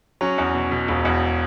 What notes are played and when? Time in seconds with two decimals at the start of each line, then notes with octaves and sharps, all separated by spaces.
0.21 F#3 C#4
0.38 E2
0.55 B2
0.71 B2
0.88 E1
1.05 E2